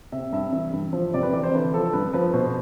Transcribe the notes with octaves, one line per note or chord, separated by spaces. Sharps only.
C3 E5
G2 E5
E3
G2
F3
C3 D5
B4
E3 D5
C5
D3 B4
F3 A4
G2 B4
F3 B4
B2 C5